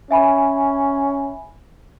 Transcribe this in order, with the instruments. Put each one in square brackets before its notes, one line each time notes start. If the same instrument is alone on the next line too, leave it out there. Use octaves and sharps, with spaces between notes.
[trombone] C#4 [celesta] E5 G#5 B5